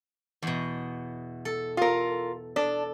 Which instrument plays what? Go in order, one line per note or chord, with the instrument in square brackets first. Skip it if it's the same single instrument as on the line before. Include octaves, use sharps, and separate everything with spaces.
[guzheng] E2 B2
A4
[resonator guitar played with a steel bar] F4 A#4
[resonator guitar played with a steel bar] D4 [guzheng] A4